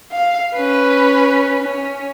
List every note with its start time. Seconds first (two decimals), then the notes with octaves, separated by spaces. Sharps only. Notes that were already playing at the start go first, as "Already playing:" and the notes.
0.12 F5
0.54 C#4 B4
1.63 C#4